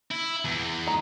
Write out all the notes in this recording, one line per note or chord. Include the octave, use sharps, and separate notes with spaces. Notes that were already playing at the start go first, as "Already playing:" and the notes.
E4
E2
G#3 D#4 A#5